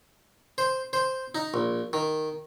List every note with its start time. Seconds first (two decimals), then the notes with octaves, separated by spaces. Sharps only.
0.58 C5
0.93 C5
1.35 D#4
1.54 A#1
1.93 D#3